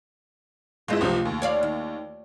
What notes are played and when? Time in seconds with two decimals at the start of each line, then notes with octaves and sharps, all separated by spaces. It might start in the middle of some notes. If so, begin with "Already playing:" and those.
0.88 G1 G#3 A3 E4 F4
1.01 C#2 C3 F3
1.25 D#2
1.42 C#5 D5 F5
1.63 D#3